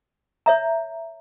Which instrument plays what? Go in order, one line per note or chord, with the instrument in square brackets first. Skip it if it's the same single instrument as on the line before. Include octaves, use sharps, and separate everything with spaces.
[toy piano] C#5 E5 A#5